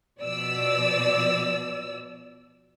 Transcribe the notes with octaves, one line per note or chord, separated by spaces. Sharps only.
B2 F3 D5 E6